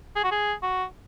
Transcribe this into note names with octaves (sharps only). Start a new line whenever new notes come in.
G#4
F#4
G#4
F#4